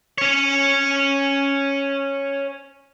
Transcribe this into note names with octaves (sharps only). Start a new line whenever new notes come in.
C#4 C#5